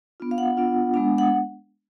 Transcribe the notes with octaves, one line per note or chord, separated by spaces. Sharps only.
B3 D4 F4
F5
F#5
B3 D4 F4
G#3 B3 D4
F#5